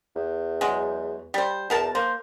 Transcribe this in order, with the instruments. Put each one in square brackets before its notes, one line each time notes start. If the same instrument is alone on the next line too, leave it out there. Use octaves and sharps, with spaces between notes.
[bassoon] E2
[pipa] F#3 G#3
G3 C5
[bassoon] E2 [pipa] B2 A#4 A5
[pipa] A#3 [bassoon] C5